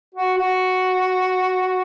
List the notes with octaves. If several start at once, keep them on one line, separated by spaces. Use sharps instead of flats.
F#4
F#4